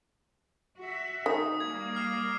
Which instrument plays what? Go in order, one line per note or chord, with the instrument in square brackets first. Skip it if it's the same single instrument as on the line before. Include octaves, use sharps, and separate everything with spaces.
[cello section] F#4 E5
[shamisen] D#3 [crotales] D#6
[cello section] G3 A#3 [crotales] G#6
[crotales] D6 F6 C7